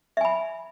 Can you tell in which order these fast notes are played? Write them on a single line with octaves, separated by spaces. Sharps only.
E5 G#5 B5